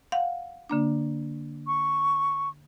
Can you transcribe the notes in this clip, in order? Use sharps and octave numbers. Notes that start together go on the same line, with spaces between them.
F5 F#5
D3 A#3 D4
C#6